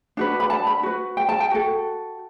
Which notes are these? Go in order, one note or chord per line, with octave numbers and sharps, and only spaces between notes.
D4 F#4 B4
B5
A5
B5
F#4 B4
G5
A5
G5
F#4 A4